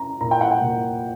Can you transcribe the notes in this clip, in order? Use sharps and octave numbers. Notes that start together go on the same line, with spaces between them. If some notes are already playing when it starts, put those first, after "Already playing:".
Already playing: C#4 A#5
A#2 A#5
G5
F#5
G5
A#2